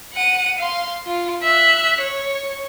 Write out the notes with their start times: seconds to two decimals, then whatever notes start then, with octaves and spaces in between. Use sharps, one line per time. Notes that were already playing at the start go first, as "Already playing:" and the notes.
0.14 F#5 D#7
0.58 F5 C6
1.06 F4
1.43 E5 F#6
2.01 C#5